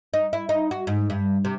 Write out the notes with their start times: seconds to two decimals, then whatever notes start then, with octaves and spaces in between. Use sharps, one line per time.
0.14 D#4
0.33 E4
0.49 D#4
0.71 F#4
0.87 G#2
1.10 G2
1.45 C3